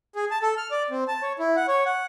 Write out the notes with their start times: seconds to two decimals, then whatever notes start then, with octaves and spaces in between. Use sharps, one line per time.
0.16 G#4
0.31 A5
0.42 A4
0.57 F6
0.71 D5
0.90 C4
1.08 A5
1.22 C#5
1.39 E4
1.56 F#5
1.68 C#5
1.85 F#5